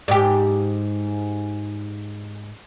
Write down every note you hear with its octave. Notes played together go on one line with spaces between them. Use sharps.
G#2 G4